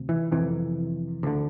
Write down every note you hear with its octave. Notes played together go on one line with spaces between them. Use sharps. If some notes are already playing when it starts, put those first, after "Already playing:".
Already playing: D2 C3
E3
F2 C3 E3
D2 D3